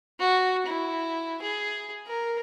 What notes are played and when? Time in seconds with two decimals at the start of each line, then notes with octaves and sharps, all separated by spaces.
0.19 F#4
0.66 E4
1.42 G#4
2.07 A#4